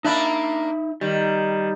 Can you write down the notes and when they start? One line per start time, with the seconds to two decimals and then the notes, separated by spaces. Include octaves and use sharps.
0.05 A#3 D4 D#4 E5 B5
1.01 D#3 G3